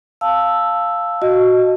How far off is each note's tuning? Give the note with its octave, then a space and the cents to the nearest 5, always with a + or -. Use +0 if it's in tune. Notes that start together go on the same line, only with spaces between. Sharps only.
F5 +0 A5 +0 E6 +0
F#4 +0 D#5 +0